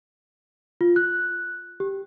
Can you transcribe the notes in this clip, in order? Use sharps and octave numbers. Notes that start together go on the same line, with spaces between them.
F4
F#6
G4